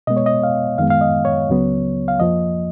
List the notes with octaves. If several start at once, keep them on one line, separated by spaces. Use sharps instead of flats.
B2 G#3 B3 D#5
C#5
D#5
F5
F#2 D#3 G#3 B3 F5
F5
D#5
C#5
C#2 C#3 F#3 B3
F5
F2 F3 A#3 D#5